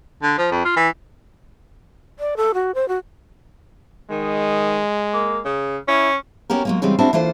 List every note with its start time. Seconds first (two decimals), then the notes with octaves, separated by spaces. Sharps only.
0.23 D3
0.38 F3
0.52 F2
0.65 F4
0.76 E3
2.19 D5
2.37 A4
2.54 F#4
2.75 C5
2.88 F#4
4.10 D#3 G#3
5.13 A#3
5.45 C#3
5.88 C#4 E4
6.50 B3 C#4 F#4 G4 A#4
6.65 F#3 G#3 A#3
6.82 C#3 E3 G3 G#3 C4 G4
6.99 G3 G#3 C4 D4 E4 F#4
7.13 E3 A#3 D4 F4 A4 C5